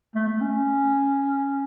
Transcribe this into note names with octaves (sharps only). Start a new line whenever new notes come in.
A3
A3
C#4